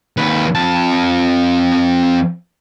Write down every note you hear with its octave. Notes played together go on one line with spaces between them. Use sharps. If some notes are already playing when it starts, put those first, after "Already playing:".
D#2 B4
F2 A5